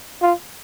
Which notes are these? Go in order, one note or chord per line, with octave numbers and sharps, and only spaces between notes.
F4